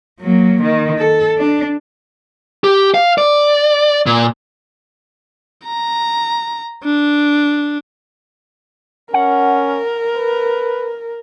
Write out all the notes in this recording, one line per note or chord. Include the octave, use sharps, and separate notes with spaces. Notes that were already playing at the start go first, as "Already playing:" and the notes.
F#3 A#3
D#3
A4
D4
G4
F5
D5
A#2
A#5
D4
C#4 A#4 F#5
B4